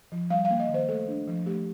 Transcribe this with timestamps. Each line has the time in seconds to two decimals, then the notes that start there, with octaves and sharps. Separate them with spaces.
0.12 F3
0.30 G3 F5
0.45 F5
0.50 A#3
0.60 D#5
0.69 D#3
0.74 C5
0.89 A3 A4
1.08 D4
1.28 F3
1.46 A3 G4